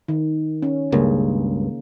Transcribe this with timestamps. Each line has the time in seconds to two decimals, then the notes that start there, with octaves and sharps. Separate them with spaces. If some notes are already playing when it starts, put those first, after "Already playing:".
0.08 D#3
0.62 C#4
0.92 C#2 G2 C#3 A#3 G#4